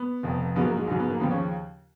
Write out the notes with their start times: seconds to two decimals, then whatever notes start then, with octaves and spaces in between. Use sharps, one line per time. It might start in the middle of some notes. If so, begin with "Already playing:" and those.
Already playing: B3
0.23 F1 F2 F3
0.56 A#1 G#2 F#3 B3
0.66 A#3
0.77 G#3
0.88 A#1 G#2 F#3
1.00 B3
1.10 A#3
1.20 D#2 C#3 F3 B3
1.31 C#4